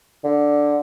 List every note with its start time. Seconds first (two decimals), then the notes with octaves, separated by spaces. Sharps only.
0.24 D3